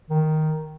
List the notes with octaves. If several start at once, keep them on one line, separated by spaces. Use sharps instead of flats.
D#3